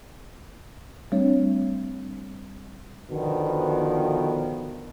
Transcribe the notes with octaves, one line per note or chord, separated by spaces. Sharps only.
G3 A3 C4 D4 C#5
B2 D3 D#3 F3 B3